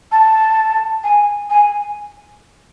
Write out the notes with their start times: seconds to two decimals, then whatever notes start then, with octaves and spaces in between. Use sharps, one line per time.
0.12 A5
1.04 G#5
1.50 G#5